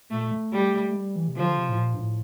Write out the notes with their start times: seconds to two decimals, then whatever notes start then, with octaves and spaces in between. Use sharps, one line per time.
0.11 A#2 A3
0.32 A3
0.53 G3
0.89 A3
0.94 G3
1.16 E3
1.28 C3
1.37 D3 F3
1.57 C3
1.69 A2
1.78 A#2
1.94 G2
1.99 A2